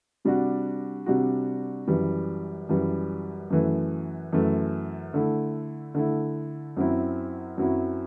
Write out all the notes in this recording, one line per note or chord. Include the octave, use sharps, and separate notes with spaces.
C3 G3 D4 F#4
C3 G3 D4 F#4
F#2 E3 G3
F#2 E3 G3
F#2 E3 A3
F#2 E3 A3
D3 A3 E4
D3 A3 E4
F#2 F#3 C4 E4
F#2 F#3 C4 E4